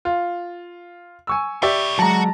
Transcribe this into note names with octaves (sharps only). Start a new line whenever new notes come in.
F4
G#5 C#6 E6
G4 B4 C#5 D5 E5
F#3 G#3 F#4 A5 A#5